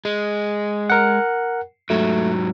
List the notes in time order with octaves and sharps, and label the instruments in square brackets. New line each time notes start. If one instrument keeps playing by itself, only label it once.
[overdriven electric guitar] G#3
[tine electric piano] A#4 F#5
[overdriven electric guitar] G#2 F#3 [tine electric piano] A3